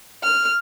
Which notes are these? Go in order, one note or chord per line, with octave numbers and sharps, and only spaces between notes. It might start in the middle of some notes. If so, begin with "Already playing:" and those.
F6